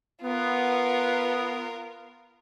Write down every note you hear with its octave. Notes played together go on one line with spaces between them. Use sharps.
B3 F4 A#4